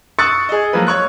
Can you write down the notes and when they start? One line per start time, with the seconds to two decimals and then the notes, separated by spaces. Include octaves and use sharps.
0.19 C#6 D#6 E6 F#6 A6 C#7
0.49 G#4 D#5
0.73 F3 F#3 G#3 A#3 B4
0.87 C#5 C#6 F#6